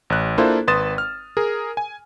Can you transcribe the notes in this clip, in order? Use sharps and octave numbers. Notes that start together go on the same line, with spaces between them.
A1 F#6
A#3 D4 E4 F4 A4 C5
G#1 B4 C6 D#6 A6 E7
F6
G#4 A#4
G#5